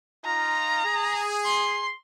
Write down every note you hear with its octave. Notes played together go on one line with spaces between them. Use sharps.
D#4 F4 A#5
G#4
C6